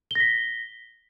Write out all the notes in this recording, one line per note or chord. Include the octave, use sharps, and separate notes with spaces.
A#6 B6 G7